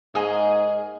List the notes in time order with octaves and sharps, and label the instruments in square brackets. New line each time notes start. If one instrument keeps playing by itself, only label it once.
[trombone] G#2 [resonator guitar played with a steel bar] A#3 G#5 [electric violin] G#4 [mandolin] D#5